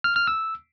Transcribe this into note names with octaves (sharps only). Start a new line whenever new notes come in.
F6
F6
E6